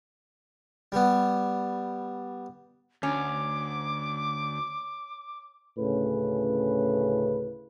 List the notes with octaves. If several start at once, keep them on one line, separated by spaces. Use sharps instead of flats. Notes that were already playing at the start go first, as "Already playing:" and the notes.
G3 B3
D2 C#4 D6
D2 A2 C#3 C#4 B4